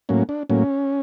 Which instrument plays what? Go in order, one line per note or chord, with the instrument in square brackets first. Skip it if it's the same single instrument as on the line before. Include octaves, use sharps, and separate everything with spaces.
[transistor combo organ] A2 F#3 A#3 C#4
D4
A2 F#3 A#3 C#4